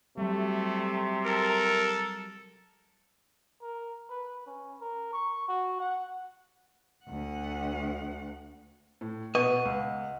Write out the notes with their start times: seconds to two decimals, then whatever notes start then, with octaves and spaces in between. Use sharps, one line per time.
0.18 C3 F#3 G3 A3
1.26 A4 A#4
3.62 A#4
4.10 B4
4.46 C#4
4.81 A#4
5.13 C#6
5.48 F#4
5.80 F#5
7.06 D2 F#5
9.01 A2
9.35 B2 B4 D#5 F#5 C#6
9.65 C#2